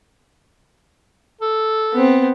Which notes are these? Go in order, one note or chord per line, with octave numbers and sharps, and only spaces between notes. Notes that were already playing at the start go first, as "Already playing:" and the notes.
A4
B3 C4